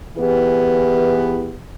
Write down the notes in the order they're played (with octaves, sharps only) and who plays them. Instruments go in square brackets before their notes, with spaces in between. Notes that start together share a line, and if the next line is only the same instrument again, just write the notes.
[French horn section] E3 B3 E4 G4 G#4 B4